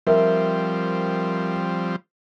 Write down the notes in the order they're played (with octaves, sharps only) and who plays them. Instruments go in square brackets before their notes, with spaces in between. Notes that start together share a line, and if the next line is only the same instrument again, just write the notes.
[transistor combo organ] F3 G3 C4 [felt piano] A#4 E5